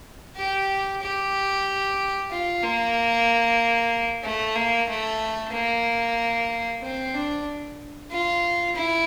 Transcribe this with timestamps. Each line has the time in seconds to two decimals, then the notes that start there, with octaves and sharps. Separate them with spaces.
0.37 G4
1.02 G4
2.31 F4
2.63 A#3
4.24 A3
4.56 A#3
4.89 A3
5.53 A#3
6.82 C4
7.14 D4
8.11 F4
8.76 E4